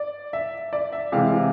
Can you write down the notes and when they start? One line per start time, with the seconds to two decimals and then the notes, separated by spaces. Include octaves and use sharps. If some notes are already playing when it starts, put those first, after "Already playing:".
Already playing: D5
0.33 E5
0.73 D5
0.93 E5
1.12 C3 E3 G#3 F5